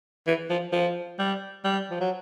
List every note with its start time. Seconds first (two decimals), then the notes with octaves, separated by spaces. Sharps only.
0.27 E3
0.50 F3
0.73 F3
1.19 G3
1.64 G3
1.90 F3
2.01 F#3